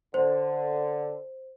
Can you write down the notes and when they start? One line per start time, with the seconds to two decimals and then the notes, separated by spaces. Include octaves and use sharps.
0.14 D3 C5